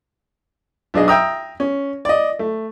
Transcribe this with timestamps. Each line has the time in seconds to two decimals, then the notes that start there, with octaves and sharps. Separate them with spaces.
0.94 B1 D4 G#4 D#5
1.08 E5 G5 A#5 D#6
1.60 C#4
2.05 D5 D#5
2.39 A3